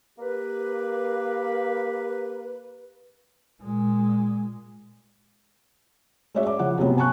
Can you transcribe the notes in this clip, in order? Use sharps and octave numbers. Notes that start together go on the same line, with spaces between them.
A#3 G4 B4
A#2 G#3
G#3 C#4 F#4 C#5 D5 E5
D6
C#3 F3 F#5
C3 F#3 B3 C#4
G#5 A5 C#6 F#6